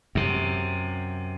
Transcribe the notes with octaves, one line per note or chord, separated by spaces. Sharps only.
F#2 C3